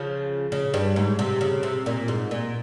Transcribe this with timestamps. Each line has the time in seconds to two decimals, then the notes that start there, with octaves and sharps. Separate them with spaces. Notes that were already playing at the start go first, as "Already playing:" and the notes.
Already playing: C#3 F3
0.52 C#3
0.74 G2
0.96 G#2
1.19 C3
1.41 C#3
1.63 C3
1.86 A#2
2.08 G#2
2.31 A#2